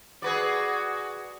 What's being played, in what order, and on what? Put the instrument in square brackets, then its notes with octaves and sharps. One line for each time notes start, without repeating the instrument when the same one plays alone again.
[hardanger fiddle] F#4 [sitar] G#4 B4 D5